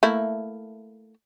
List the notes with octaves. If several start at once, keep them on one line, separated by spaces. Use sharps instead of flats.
A3 A#3 E4